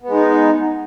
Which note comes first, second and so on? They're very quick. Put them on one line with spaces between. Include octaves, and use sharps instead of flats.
B3 G#3 D#4